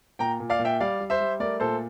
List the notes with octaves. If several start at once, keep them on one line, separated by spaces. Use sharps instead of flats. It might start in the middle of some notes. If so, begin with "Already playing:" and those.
A#2 G5 A#5
A#2
D5 F5
A#2
E5 G5
G3 D5 F5
G3
C5 E5
G3
A3 A#4 D5
A#2 A4 C5